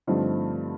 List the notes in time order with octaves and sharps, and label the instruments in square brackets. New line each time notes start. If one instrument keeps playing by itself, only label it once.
[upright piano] G2 D3 F3 A3 C4 D#4